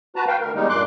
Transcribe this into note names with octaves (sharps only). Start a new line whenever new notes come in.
F#4 B4 A5 A#5
B4 F5 G5
D2 A#4
E2 G3 G#3 A#3 D#4
G2 A#2 C6 D6 F#6